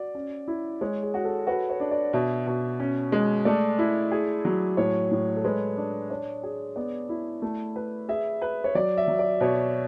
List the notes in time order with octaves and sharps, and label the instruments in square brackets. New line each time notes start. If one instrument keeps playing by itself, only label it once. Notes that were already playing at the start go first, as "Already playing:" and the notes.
Already playing: [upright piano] F#4 [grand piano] D5
[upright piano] C#4
E4
[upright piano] G#3 [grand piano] C#5
[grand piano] G#4
[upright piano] F#4
[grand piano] A4
[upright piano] F#4 [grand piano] B4
[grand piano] C#5
[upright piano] D4
[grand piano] D5
[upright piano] B2 [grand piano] E5
[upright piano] B2
C#4
G#3
[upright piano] A3 [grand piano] D5
[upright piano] E4
G#4
F#3
[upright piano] A2 [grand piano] C#5
[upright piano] A2
[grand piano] A4
[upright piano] G#3 [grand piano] B4
[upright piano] D4
[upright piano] D4 [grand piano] C#5
[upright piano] G#4
[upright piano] B3 [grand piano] D5
[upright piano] E4
A3
B4
[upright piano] G#4 [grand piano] E5
[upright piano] B4
[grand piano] C#5
[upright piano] F#3 [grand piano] D5
[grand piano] E5
[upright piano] F#3
[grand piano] D5
[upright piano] B2 [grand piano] C#5